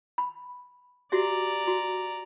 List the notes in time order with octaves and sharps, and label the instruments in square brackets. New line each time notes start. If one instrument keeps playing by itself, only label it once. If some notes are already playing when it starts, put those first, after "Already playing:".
[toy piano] B5
[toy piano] F#4 G4 E5 [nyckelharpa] D5 A#5
[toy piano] F#4